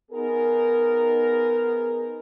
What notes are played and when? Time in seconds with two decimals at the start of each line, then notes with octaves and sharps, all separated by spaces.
0.12 B3 D#4 G#4 A#4